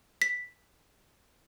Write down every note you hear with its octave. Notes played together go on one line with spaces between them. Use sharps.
B6